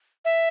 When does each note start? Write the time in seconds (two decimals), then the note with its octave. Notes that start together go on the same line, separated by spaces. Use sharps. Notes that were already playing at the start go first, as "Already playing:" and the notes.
0.25 E5